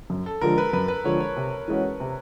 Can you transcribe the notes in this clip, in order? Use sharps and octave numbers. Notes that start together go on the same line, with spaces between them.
F#2
A4
D3 F3 G#3 A#4
B4
F#2 B4
B4
D3 F3 G#3 C#5
C#5
C3
E3 G#3 C#4 F#4
C3